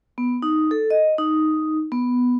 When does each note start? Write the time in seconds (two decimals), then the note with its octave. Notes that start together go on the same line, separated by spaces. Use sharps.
0.18 B3
0.42 D#4
0.71 A4
0.90 D#5
1.18 D#4
1.92 B3